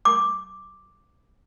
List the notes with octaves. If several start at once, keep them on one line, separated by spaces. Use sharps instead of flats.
D6